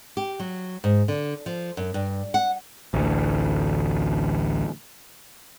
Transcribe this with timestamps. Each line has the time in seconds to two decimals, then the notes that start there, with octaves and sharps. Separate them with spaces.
0.17 G4
0.40 F#3
0.84 G#2
1.08 D3
1.46 F3
1.77 F#2
1.94 G2
2.34 F#5
2.94 A1 D2